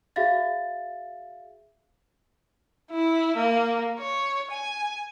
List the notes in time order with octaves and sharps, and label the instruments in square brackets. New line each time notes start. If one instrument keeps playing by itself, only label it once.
[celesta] F#4 G#4 E5 F5 A6
[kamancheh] E4
A#3
C#5
G#5